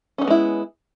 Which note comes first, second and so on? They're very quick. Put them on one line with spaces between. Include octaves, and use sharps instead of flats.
C#4 D#4 B3 G#3 E4